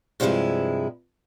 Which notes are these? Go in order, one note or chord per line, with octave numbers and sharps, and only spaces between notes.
G2 C3 F3 G#3 E4